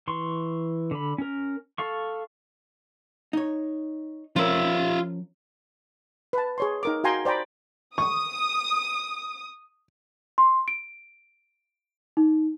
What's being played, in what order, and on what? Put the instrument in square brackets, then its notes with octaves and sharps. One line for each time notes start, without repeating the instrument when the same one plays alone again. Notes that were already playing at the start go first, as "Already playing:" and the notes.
[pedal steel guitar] E3 C6 C#6
D3 B5
C#4 A#4
A4 F5 C#6
[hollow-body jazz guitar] D#4 C#5
[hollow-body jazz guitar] F3 C#4 A#4 [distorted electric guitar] F4 E5
[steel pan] B4 A5
G#4 C#5 C6
D#4 A#4 D6
F#4 F5 G5 G#5 A#5 C6
C5 D5 G5 A#5 B5
[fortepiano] C#6 [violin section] D#6
[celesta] C6
D7
D#4